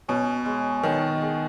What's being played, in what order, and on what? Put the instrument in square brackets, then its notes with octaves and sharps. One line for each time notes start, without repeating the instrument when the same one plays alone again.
[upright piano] B2 [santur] C#4
[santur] G#3
[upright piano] B2 D#3 [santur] C#5
[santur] G#4